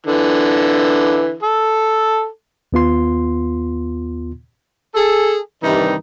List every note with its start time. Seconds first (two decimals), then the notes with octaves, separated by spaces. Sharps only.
0.06 D3 E3
1.43 A4
2.73 D#2 B3 F4 C6
4.95 G#4 A4
5.63 G2 C3 D#3 E3 G3 D#4